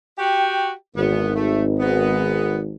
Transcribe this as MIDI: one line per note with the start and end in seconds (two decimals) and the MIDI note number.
0.19 0.71 66
0.19 0.71 67
0.19 0.69 79
0.96 2.75 32
0.96 1.31 40
0.96 1.31 59
1.35 1.63 57
1.80 2.57 44
1.80 2.57 59